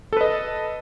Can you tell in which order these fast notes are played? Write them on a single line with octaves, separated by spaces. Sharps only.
A4 B4 D#5